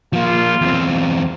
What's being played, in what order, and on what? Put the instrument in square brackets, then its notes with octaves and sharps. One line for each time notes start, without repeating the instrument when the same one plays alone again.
[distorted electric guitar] F3 A#3 [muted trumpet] F4
[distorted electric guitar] E2 C4